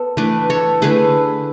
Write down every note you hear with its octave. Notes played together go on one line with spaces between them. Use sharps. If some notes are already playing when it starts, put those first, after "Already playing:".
Already playing: B3 A4
E3 A3 D4 B4 D5
A4 C#5
D3 A3 E4 G#4 B4